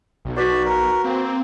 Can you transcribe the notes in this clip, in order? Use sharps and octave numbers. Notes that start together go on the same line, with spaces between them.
B1
F#4 B4 D5 B6
A#4
A#3 C4